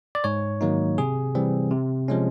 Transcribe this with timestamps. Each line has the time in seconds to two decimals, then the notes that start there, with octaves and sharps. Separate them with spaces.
0.15 D5
0.24 G#2 C#5
0.61 D#3 F#3 A#3 D#4
0.98 C3 G#4
1.35 E3 G3 C4
1.71 C3
2.08 F3 G#3 C#4